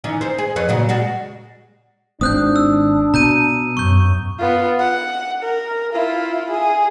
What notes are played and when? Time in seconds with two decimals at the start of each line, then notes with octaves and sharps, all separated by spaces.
0.04 D#3 E3 C#4
0.21 C4 C5
0.38 G#4
0.56 F2 B4 C#5
0.69 A#2 C#3 F#3
0.89 G3 G#3 F#4
2.21 G#1 C4 D4 D#6 F#6 G6
2.56 E6
3.14 B2 A#5 G6 D#7
3.77 F#2 C#6 G6
4.40 B3 F4
4.79 F#5
5.43 A#4
5.93 E4 F4
6.51 G#4